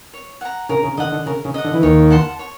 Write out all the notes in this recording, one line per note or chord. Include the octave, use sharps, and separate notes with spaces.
C#5
F#5 A#5
C#3 A#4
C#3
D3 D#5 F#5
D3
C#3 A#4
C#3
D#5 F#5
D3
E3
D#2 D#3 C#5
F#5 A5 C6
C#5